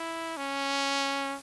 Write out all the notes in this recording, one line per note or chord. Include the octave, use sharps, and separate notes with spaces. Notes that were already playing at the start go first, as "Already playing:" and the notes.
Already playing: E4
C#4